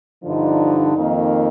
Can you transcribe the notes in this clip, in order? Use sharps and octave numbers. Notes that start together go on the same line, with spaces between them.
G2 D3 F3 D#4
F2 D#3 A#3